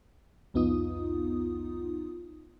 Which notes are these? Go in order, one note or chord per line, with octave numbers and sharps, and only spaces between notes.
C2 F2 B3 D#4 F4 D#6